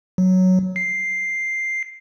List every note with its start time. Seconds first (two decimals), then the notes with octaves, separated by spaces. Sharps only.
0.18 F#3
0.76 C7